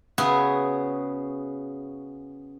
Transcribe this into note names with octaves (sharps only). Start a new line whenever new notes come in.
C#3 B3 F#4 G#4 E5